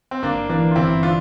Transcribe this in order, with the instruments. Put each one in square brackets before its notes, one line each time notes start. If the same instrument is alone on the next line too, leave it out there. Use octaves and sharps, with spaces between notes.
[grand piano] C4
[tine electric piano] G1 [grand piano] A#3 D4
[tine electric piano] E3 [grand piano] A#3 D4
[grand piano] F4
[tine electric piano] G1 [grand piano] C4 E4
[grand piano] D4 F4